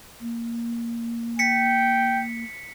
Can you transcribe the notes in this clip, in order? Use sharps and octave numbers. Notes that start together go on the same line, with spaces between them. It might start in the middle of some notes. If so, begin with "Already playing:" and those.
A#3
G5 B6 C#7